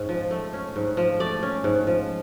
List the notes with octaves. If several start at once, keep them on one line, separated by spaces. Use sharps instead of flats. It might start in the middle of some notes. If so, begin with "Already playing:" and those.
Already playing: G#2 C#4
F3
A3
C#4
G#2
F3
A3 D5
C#4
G#2
F3